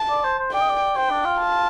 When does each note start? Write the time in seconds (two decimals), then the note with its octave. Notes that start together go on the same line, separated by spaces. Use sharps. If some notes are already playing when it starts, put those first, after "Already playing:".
Already playing: A5
0.10 D5
0.24 C5
0.39 C5
0.53 D5 G5
0.61 D#5
0.70 D5
0.96 C5 G5
1.10 D4
1.25 F4
1.39 A5